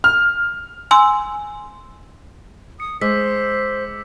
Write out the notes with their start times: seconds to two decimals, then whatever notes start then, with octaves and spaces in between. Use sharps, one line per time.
0.04 F6
0.91 G#5 C6 E6
2.80 D#6 C#7
3.01 G#3 C5 D6 E6 B6